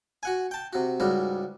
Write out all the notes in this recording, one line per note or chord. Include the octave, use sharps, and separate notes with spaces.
F#4 F#5 G#5
G5 A5
C3 F#4
C#2 G#2 G3 F#4